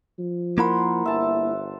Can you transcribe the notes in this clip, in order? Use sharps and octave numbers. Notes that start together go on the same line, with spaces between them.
F3
A#3 E4 A#4 C5 F#5 B5
G1 E5 A5